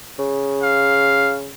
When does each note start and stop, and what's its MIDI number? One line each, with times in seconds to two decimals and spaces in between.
0.19 1.53 49
0.63 1.36 77